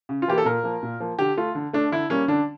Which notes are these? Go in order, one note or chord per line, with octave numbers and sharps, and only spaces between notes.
C#3
F4
E3 A#3 G4
A4
A#2 A#4
F3 A#3
A#2
F3 A#3
D3 G4
A3 F4
D3
A3 D4
D3 E4
G3 A#3 C#4
D3 D4